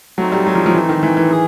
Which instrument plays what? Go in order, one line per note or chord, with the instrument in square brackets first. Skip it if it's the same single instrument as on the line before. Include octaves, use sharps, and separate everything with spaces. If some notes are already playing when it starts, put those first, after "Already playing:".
[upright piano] F#3 [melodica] A3 C4 D#4
[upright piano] G3
F#3
F3
F3
E3
D#3
E3
E3
[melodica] G#4